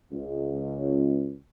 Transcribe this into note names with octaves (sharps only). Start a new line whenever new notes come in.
C#2